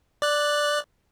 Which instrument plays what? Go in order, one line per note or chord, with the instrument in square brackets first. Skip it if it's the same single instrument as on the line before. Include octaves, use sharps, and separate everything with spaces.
[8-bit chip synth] D5 F#6